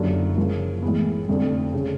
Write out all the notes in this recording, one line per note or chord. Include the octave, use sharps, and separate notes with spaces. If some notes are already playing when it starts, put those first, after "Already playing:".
Already playing: F#1 F#2 D3 G3
C#3 F3 A#3
A2 E3 G#3 B3
F1 F2 D3
C#3